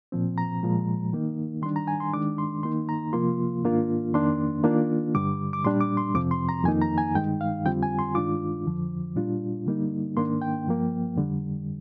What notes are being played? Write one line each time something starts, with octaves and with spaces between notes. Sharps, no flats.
A#2 F3 C4
A#5
A#2 F3 G#3
D#3 A#3 D#4
D#3 G3 D4 C6
A#5
G#5
C6
D#3 G#3 D4 D6
C6
D#3 A#3 D#4 C6
A#5
C3 F3 A#3 F4 C6
G#2 D#3 A#3 D4 F4
F2 D#3 A#3 D4 C6
D#3 A#3 D4 F4
G2 D3 G3 D6
D6
A#2 G3 D4 C6
D6
C6
F2 C3 F3 C4 D6
C6
A#5
F2 D#3 A#3 D#4 G#5
A#5
G#5
G2 D#3 G#3 D#4 G5
F5
F2 D3 G3 C4 F4 G5
G#5
C6
G2 D#3 G#3 D4 F4 D6
F2 D3 F3
A#2 G3 D4 F4
D3 G3 A#3 D#4
G#2 D#3 A#3 D4 C6
G5
G2 F3 A#3
F2 D3 G3